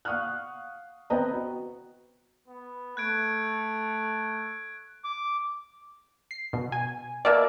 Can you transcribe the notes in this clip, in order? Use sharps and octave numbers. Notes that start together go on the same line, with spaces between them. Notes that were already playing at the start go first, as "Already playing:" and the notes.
F5 F#5 C#6 D#6 F6 F#6
B3 C4 B4 D#5 G5 A#5
F#4
B3
A3 F#6 G#6 D7
D6
C7
B2
G#5
B2 A#3 D5 E5